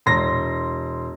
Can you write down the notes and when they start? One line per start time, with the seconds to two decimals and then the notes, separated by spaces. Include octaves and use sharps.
0.06 E1 C6 A#6